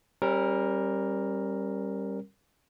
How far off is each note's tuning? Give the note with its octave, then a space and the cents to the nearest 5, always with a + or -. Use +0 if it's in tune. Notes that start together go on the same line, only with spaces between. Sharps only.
G3 +0 C#4 -40 A#4 +0